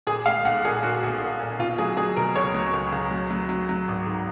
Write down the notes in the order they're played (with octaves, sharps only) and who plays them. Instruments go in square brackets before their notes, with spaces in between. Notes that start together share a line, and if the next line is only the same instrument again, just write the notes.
[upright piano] A#2 G#4
G#3 F5
B1 F#5
A#2 G#4
A#2 F#4
B1
A#2
A#2
B2 F4
F#3 G#4
F#3 G#4
B2 A#4
C#2 C#5
F#3
C#2
C#2
F#3
F#3
F#3
F#3
G#1
G#2